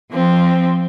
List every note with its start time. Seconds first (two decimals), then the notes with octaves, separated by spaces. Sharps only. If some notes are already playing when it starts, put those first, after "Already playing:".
0.11 F3 C4